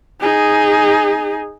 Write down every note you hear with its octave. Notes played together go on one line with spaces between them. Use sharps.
D#4 G#4